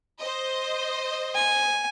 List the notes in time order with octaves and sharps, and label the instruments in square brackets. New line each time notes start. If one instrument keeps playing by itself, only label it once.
[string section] C5 D#5
[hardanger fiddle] G#5